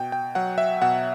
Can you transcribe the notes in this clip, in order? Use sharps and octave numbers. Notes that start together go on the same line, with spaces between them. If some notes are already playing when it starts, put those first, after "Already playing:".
Already playing: B2 G5
G5
F#3 F#5
E5
B2 F#5